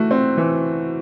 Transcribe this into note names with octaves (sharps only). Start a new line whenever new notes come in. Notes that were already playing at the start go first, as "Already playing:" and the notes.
Already playing: E3 A3 F#4
C4
E3